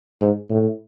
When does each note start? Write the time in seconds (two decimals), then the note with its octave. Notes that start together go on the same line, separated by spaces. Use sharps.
0.21 G#2
0.50 A2